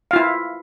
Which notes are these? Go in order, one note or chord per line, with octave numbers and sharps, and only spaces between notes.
E4 F4 F5